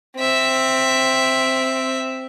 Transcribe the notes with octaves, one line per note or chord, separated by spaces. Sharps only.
C4 E5